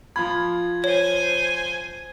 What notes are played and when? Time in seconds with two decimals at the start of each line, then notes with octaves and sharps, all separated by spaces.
0.16 F3 F4 B5 G#6
0.84 C5 C#5 G#5